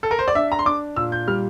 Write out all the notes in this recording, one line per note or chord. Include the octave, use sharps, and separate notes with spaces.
A4
A#4
C5
D5
D4 E5
A#5
C6
D4 D6
A#2 E6
G6
G3 F6